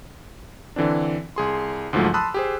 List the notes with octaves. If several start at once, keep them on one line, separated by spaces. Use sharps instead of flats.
D3 E3 C4 D4
C2 G#4 C6
D2 G#2 F3 F#3 A3
A5 B5 C6 D#6 E6 F#6
G4 G#4 C5